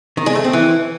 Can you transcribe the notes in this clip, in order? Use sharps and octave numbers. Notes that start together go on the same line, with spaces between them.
D#3
G#3
A3
C4
E3